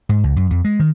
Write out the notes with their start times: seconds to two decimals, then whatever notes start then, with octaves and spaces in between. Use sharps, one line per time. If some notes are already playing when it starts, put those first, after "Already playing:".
0.09 G#2
0.23 C#2
0.36 F#2
0.51 F2
0.65 G#3
0.79 D#3